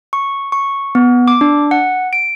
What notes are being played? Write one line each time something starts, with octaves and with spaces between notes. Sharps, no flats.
C#6
C#6
B3
D6
D4
F#5
D7